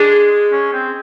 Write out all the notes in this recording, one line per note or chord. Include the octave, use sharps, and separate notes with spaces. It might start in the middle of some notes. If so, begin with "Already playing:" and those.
Already playing: G#3 D4
C#4
C4